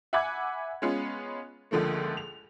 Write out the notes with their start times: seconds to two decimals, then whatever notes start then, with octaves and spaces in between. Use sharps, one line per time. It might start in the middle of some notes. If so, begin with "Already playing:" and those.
0.13 E5 F#5 G#5 B5 D6 G#6
0.82 G#3 B3 C#4 F4
1.71 C#2 D3 F3 A3 A#3
2.17 F7